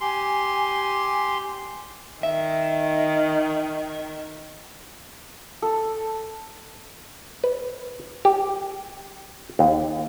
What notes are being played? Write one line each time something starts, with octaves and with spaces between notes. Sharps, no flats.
G4 G#5 C6
D#3 E5
A4
B4
G4
D#2